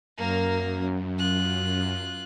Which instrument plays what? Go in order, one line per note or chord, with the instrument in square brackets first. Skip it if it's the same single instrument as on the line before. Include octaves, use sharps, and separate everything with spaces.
[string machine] F#2 [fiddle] A#3 A#4
[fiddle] F4 F#6